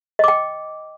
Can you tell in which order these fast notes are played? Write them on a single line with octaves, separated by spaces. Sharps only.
D#5 D6 G5